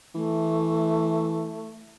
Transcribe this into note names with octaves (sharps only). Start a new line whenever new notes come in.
E3 A3